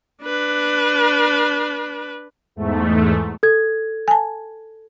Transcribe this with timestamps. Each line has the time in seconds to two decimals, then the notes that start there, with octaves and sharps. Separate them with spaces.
0.23 D4 B4
2.56 E2 G#2 A3
3.43 A4 G#6
4.08 G#5 A5